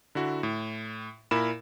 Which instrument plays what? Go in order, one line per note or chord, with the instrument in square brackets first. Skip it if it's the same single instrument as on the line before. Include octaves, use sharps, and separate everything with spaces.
[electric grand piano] D3 E4 F#4
A2
A#2 E4 A#4 B5 E7